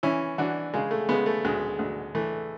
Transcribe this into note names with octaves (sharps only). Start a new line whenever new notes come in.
E3 C#4 E4
E3 D4 F#4
C#3 G#3
A3
C#3 G#3 B3
A3
D2 G#3
D2
E3 A3